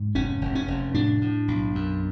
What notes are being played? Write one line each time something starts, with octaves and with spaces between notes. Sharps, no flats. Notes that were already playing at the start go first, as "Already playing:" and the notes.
Already playing: G#2
F1 C#4
F1
C#4
F1
A2 D4
A2
B1
F#2